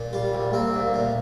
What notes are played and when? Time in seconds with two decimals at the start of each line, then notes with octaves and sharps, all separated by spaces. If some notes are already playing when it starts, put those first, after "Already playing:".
Already playing: A#2
0.13 G3 F4
0.33 C2
0.53 A#3 C4
0.74 D2
0.94 A#2